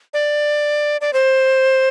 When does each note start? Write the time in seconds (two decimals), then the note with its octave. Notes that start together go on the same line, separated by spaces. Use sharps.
0.14 D5
1.01 D5
1.13 C5